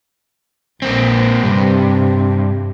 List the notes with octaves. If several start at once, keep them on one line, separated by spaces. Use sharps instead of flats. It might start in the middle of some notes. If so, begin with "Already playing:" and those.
A#1 A#3 C4
G2 C3 C4